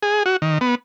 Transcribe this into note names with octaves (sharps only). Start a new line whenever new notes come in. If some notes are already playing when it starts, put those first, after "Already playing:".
G#4
F#4
D#3
B3